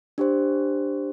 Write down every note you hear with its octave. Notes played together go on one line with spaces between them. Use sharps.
D4 G4 C5